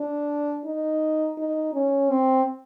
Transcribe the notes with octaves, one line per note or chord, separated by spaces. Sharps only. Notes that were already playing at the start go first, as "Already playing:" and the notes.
Already playing: D4
D#4
D#4
C#4
C4